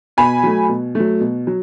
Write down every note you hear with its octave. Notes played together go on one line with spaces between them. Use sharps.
B2 G#5 B5
F#3 A3
B2
F#3 A3
B2
F#3